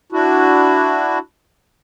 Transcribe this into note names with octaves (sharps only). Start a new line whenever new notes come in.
D4 E4 F#4